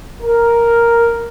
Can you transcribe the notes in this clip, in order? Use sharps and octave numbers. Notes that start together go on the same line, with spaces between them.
A#4